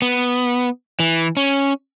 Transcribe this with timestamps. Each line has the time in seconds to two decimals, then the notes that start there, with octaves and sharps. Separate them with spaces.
0.02 B3
1.00 E3
1.37 C#4